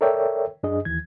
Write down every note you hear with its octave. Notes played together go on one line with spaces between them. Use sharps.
A4 A#4 C#5 D5 E5 G5
F#2 D4 G#4 D#5
D#2 E3 G#6